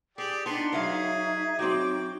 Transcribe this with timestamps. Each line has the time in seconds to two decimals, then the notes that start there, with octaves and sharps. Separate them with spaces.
0.18 G4 G#4 D5
0.46 B3 D4 D#4 C6
0.72 F#3 G#4 E5 F5 A#5
1.59 F#3 C4 F#4 G5 D6